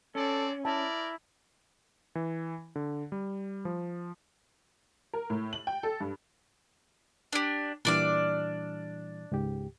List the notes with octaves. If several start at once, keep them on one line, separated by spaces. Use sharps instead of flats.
C4 C#4 A4 D5
E4 A#4 D5 A5
E3
D3
G3
F3
A#4
A2
F#7
G5
A4
G2
D4 G4
A#2 E3 G3 D4 D5 F6
C#2 G#2 G4